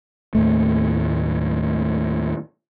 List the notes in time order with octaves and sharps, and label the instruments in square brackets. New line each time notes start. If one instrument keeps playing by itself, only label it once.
[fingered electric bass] D#2 A2 A3